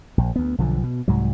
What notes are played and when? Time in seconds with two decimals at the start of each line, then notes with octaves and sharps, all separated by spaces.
0.18 A#1
0.36 D2 B3
0.58 B1 D3 F3
0.83 B2
1.08 C2 G#2 F#3